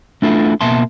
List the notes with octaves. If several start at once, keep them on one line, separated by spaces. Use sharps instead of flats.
A3 B3 D4 E4 F4 A4
B2 A#3 E5 A5 C6